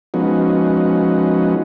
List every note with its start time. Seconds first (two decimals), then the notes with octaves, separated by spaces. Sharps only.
0.14 F3 G#3 B3 C#4 D#4 F#4